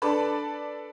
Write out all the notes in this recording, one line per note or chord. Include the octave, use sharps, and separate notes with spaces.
D4 A4 B4 D5 A5 B5